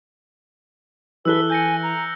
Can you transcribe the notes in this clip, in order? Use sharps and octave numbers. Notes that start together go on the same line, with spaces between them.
E3 A4 B4 E6 F#6 G7
G#5 G6 A#6 C#7
A#5